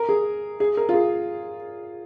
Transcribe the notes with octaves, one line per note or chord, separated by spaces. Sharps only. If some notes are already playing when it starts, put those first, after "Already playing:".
Already playing: A#4
G#4
G#4
A#4
F4
G#4